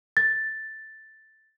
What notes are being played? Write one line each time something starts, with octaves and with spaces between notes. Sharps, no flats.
A6